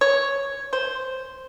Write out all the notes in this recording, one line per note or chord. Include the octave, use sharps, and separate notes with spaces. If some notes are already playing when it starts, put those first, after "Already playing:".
C#5
C5